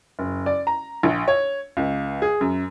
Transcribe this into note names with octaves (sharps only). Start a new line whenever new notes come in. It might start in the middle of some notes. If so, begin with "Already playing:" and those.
F#1
D5
A#5
A#1
C#5
C#2
G#4
F#2